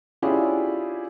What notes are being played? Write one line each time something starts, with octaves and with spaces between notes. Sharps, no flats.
C#4 D4 E4 F4 G4 G#4